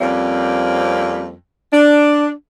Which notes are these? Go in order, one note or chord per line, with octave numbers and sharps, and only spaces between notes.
F2 G3 A#3 C4 C#4
D4